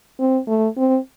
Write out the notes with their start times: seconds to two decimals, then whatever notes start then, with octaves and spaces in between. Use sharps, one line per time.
0.19 C4
0.47 A3
0.77 C4